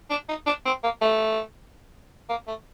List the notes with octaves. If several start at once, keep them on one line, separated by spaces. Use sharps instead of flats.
D4
D#4
D4
C4
A#3
A3
A#3
A3